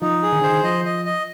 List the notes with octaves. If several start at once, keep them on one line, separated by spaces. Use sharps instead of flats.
F3 D#4
G#4
D#3
D3 C5
D#3
F3 D#5
D#5
D#5